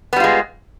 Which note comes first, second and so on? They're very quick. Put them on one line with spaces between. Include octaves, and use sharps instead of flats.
B3 G3 F4 G#3